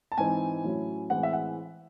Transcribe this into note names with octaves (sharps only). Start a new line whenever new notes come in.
A5
G#2 E3 C4 D#4 G#5
A2 F#3 C#4 E4
A2 E3 G#3 C4 F#5
E5
F#5